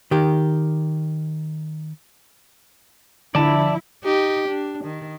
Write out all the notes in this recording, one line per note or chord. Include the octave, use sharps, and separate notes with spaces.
D#3 G4
D3 F3 E4 D5 A5
D#4 G4
D4
D#3